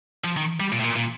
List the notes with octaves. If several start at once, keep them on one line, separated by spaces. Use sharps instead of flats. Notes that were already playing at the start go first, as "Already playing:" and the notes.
F3
D#3
G3
A#2
A2
A#2
A#2